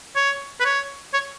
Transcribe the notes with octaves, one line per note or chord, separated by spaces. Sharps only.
C#5
B4
C#5
C#5